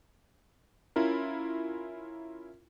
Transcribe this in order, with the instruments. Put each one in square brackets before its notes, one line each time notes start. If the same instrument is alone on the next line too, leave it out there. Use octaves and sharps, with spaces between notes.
[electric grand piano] C#4 E4 F4 A#4